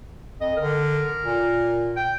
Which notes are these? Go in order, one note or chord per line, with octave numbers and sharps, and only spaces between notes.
F2 D#5
D3 A#4
A#2
G5